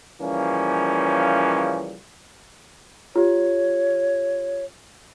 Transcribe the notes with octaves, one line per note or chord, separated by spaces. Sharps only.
C#3 E3 F3 G3 A#3 C#4
F4 G4 C#5